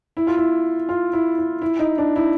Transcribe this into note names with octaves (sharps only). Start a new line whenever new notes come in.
E4
F4
E4
F4
E4
E4
E4
D#4
D4
E4